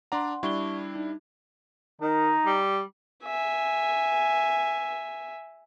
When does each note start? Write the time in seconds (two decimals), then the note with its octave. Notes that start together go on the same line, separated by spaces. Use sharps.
0.12 D4 D5 F#5 A#5 C6
0.43 G3 D4 E4 C#6 G7
0.95 D#4
2.01 D#3 D#4
2.46 G3
3.24 E5 G#5